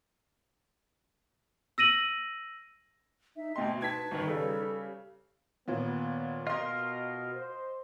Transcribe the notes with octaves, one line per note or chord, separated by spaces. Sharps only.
E6 A#6 D#7 F#7
D#4 E5
D2 B2 D#5 G5 C6
D#4 B4 A5 G#6 B6
G1 D#3 D#4
C#3 G3 A4
D#2 A#2 B3
B2 F4 A#4 D#5 C6
C5